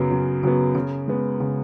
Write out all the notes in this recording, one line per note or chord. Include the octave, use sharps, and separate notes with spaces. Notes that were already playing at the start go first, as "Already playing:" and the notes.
Already playing: F#2 C#3 F#3 B3
F#2
C#3 F#3 B3
C#3
G#3 B3
C#3